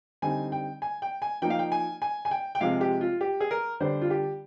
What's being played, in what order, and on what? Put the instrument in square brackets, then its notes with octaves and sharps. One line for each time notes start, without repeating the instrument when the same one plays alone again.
[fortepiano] D3 G3 C4 D#4 G#5
G5
G#5
G5
G#5
F3 A#3 D#4 G5
F5
G5
G#5
G#5
G#5
G5
G5
C3 F3 G#3 F5
G4
F4
G4
G#4
A#4
D3 G3 D4 C5
F4
G4